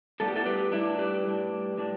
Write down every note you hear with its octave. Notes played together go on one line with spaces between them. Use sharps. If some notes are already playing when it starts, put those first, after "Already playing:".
A2 G3 B3 D4 A4
G4
E4 A4
G4 B4
A2 G3 B3 D4 E4
G4 B4
A2 G3 D4
A2 G3 D4